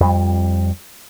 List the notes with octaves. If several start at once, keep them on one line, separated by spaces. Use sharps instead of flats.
F2 G3